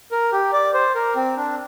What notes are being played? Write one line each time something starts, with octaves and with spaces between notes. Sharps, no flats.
A#4
G4
D5
C5
A#4
C4
D4